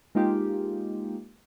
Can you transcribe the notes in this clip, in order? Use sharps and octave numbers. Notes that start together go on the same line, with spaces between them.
G#3 A#3 D#4 F4 G4